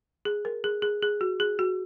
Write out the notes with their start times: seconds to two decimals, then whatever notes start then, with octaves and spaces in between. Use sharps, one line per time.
0.25 G#4
0.45 A#4
0.64 G#4
0.82 G#4
1.02 G#4
1.21 F#4
1.40 G#4
1.59 F#4